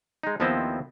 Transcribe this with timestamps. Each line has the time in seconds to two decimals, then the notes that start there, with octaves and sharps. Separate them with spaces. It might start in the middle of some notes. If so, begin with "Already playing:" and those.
0.23 G#3 D#4
0.40 D#2 F3 B3 C4 E4 D#5